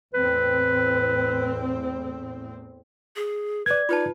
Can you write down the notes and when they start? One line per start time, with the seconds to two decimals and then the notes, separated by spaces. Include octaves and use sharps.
0.14 E2 A2 C4 B4
3.16 G#4
3.66 B4 D5 G#6
3.89 D#4 F4 B4 A5